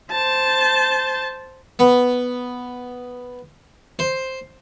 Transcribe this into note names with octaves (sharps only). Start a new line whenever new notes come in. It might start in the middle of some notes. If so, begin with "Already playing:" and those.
C5 A5
B3
C5